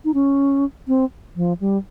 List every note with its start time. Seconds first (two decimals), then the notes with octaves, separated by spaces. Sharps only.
0.05 D#4
0.14 C#4
0.88 C4
1.36 F3
1.60 G3